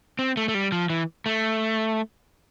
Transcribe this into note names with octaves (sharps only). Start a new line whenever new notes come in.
C4
A3
A3
G3
F3
E3
A3